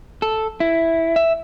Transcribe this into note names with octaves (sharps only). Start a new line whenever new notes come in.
A4
E4
E5